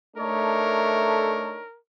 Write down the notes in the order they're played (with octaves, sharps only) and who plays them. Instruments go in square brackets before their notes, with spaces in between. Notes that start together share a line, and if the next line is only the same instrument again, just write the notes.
[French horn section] A3 [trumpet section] D4 D#4 C#5 [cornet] A#4